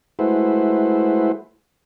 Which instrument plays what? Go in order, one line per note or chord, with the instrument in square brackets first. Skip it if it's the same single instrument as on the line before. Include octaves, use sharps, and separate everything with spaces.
[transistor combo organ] G#3 A3 E4 F#4 B4 C5